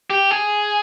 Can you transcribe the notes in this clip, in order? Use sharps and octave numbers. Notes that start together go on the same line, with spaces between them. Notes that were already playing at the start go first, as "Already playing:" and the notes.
G4
G#4